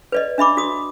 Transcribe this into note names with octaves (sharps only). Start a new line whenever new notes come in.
B4 D5 D#5
D4 E5 B5 D6
F#4 D#6